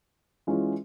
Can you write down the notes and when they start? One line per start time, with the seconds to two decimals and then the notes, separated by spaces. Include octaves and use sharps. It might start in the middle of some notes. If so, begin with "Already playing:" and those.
0.47 E3 G#3 C#4 F4